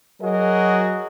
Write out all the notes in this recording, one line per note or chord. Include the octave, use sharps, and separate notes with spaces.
F#3 F#4 G#4 A#4 D#5